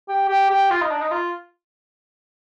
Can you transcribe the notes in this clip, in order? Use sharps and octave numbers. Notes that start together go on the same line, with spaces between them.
G4
G4
G4
F4
D#4
D4
D#4
F4